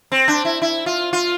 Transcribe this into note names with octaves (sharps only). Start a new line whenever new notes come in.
C4
D4
E4
E4
F4
F4